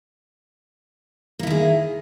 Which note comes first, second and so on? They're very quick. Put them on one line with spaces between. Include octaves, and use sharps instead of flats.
A#3 E4 D#3 G#4